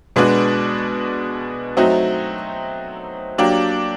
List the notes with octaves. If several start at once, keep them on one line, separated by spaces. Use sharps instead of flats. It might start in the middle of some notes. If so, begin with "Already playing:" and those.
B2 G#3 B3 D4 F#4
F#3 A3 C4 D#4 F#4
F#3 A#3 D4 G4